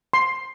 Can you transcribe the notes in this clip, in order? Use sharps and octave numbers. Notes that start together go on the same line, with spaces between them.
C6